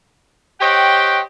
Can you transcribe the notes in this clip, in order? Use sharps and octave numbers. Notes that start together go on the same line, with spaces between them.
G4 C5 C#5 D#5 F#5 G5